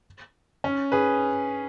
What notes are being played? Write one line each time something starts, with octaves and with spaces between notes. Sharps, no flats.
C#4
G#4 B4